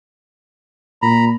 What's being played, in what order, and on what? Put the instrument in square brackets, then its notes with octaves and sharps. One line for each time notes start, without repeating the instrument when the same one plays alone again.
[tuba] A#2 [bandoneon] A#5 B5